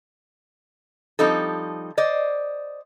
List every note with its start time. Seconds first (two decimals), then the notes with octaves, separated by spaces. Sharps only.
1.19 F3 G3 C4 D#4 A4
1.97 C5 D5 D#5